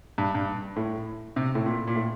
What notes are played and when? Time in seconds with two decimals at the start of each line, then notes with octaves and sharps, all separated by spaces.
0.18 G2
0.35 G2
0.76 A2
1.36 C3
1.55 A2
1.66 A#2
1.87 A#2
1.96 A2